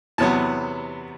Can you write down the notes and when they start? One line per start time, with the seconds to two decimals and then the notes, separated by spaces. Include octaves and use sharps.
0.18 E2 C3 F#3 B3 A5